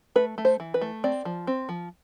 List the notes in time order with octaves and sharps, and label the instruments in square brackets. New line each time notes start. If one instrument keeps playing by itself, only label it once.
[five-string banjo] A3 B4
A3
C5
E3
B4
A3
C4 D5
F3
C4
F3